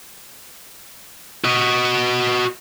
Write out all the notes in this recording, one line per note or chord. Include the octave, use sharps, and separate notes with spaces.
F#4 D#5